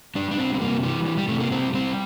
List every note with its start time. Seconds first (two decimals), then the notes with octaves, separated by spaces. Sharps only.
0.15 G3 D4
0.31 D4
0.37 G3 C4
0.55 C4
0.61 C3 A#3
0.83 E3 G3
1.06 G3
1.18 G3
1.29 C3 A3
1.40 A#3
1.52 G3 C4
1.74 G3 C4